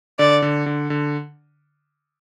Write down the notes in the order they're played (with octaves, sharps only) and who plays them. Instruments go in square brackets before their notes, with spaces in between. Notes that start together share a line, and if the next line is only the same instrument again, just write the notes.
[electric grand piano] D3 [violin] D5
[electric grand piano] D3
D3
D3